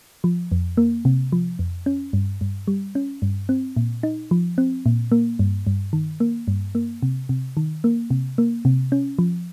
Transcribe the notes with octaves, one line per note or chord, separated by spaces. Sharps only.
F3
F2
A#3
C3
F3
F2
C#4
G2
G2
G3
C#4
G2
C4
A#2
D#4
F3
C4
A#2
A#3
G2
G2
D#3
A#3
G2
A#3
C3
C3
D#3
A#3
C3
A#3
C3
C#4
F3